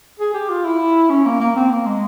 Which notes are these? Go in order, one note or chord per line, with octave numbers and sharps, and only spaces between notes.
G#4
G4
F4
E4
C#4
A#3
A#3
C4
A#3
G#3